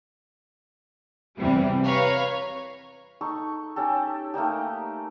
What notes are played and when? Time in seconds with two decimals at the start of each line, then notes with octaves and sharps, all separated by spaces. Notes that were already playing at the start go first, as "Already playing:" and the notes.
1.38 E2 C3 E3 G3
1.83 B4 C#5 F5 A#5
3.21 D#4 A4 C#6
3.76 C#4 G4 A4
4.34 A3 A#3 D#4 G4